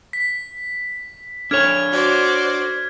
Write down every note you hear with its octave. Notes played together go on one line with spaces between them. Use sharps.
B6
D4 A4 C#5 F6 G#6
F#4 C5 D5